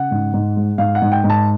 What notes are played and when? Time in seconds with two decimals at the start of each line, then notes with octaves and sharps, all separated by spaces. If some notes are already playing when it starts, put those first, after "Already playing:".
Already playing: C#3 F#5
0.11 G#2
0.34 G#2
0.56 G#3
0.78 G#2 F5
0.95 F#5
1.02 G#2
1.12 G5
1.24 G#2
1.30 A5